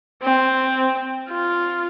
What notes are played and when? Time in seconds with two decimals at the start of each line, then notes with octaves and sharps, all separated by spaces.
0.23 C4
1.29 F4